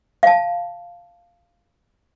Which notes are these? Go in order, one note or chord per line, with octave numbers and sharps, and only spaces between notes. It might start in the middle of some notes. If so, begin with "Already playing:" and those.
F5 A5